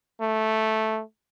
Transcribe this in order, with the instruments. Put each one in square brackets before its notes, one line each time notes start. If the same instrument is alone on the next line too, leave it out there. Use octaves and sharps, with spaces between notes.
[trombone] A3